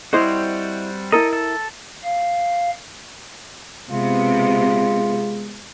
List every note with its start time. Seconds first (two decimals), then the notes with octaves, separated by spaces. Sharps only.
0.13 G3 C4 E4 F#4 C5 D#5
1.12 E4 A4 A#4 D#5
1.33 A4
2.04 F5
3.91 C3 G#3 B3 F4